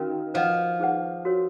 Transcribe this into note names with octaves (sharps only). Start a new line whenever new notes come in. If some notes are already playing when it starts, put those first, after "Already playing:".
Already playing: D#3 C#4 F#4 A#4 F5
F3 B4 D#5 F#5
D#4 G#4 B4 F#5
F#4 A#4 C#5